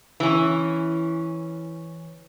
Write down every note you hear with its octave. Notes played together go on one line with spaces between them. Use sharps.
E3 C#4